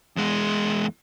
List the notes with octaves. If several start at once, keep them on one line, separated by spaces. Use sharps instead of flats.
E2 G#3